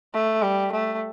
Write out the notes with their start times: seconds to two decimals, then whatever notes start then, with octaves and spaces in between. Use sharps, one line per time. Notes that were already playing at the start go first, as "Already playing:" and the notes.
0.14 A3
0.43 G3
0.73 A3